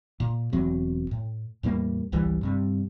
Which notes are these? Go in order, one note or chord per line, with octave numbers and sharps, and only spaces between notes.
A#2
E1 E2 F#3 C4
A2
E2 A2 G3 A#3
G#1 C#2 E3 G3
G2 C3 G3